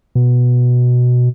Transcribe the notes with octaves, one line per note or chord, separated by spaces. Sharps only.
B2